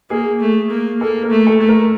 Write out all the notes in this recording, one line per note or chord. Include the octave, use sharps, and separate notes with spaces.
A#3 G#4
A3
A#3
A#3 A4
A#4
A3
A4
A3
A#4